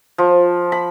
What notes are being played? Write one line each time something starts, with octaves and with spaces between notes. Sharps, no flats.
F3
B5